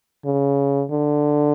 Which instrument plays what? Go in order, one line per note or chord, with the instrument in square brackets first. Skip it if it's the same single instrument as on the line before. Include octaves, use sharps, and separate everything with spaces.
[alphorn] C#3
D3